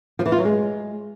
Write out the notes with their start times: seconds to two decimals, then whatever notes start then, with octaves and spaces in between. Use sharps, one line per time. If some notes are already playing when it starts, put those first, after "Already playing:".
0.19 F3
0.26 E3
0.32 F4
0.39 F#3
0.45 G#3